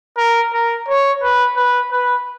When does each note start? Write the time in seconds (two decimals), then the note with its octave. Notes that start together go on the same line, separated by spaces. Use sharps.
0.17 A#4
0.53 A#4
0.88 C#5
1.22 B4
1.56 B4
1.91 B4